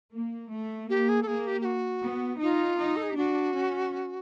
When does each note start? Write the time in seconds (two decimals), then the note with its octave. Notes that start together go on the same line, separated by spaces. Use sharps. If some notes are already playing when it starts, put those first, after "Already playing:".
0.13 A#3
0.51 A3
0.90 A#3 G4
1.09 G#4
1.22 A4
1.27 A#3 G#4
1.47 G4
1.61 G4
1.65 F#4
2.04 B3
2.41 D#4 F4
2.79 D#4
2.96 A4
3.03 G#4
3.10 G4
3.17 D4 F#4
3.55 C#4